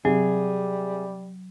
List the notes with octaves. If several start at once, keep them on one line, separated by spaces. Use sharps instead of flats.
C3 F#3 G3 G#4